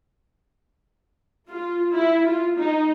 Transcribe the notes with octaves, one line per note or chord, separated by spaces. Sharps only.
F4
E4
F4
D#4